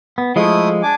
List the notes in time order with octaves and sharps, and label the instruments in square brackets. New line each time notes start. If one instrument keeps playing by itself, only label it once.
[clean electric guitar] B3
[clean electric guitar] F3 G#3 [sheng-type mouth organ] A3 E4 D#6
[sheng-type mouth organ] D4 G#5 D6